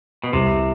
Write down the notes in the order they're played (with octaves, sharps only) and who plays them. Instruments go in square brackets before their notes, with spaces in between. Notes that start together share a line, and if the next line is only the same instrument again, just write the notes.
[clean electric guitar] B2
[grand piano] C2 [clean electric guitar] C3